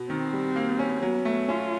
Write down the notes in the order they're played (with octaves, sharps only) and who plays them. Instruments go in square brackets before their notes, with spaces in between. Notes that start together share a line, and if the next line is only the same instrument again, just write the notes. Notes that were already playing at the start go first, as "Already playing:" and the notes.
Already playing: [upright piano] B2
[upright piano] D#3 [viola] C4
[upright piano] G3
A#3
C#4
[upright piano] F#3 [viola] B3
[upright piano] A3
[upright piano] C#4 [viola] F4